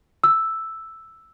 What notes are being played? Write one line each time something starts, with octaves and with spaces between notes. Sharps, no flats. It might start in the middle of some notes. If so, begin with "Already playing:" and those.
E6